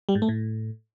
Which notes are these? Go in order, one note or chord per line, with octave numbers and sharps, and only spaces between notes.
G3
G#2
A3
A2